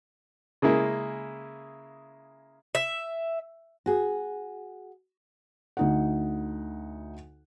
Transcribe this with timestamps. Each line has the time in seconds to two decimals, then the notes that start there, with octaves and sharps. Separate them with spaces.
0.62 C#3 G#3 A#3 E4
2.75 E5
3.86 F#4 G#4
5.77 D2 D#4 F#5